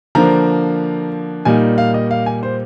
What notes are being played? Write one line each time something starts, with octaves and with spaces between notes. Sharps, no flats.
D3 F3 A#3 D4 A#5
A#2 G3 A#3 D#4 G#5
F5
D#5
F5
G#5
C5